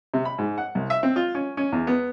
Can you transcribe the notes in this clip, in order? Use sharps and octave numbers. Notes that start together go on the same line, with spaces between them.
C3
B5
G#2
F#5
C2
E5
C4
F4
C#4
C#4
E2
B3